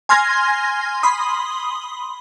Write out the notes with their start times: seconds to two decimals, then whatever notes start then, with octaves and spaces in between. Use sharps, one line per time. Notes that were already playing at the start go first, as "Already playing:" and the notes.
0.09 G#5 C6 F6 G#6 A#6
1.03 B5 C6 D#6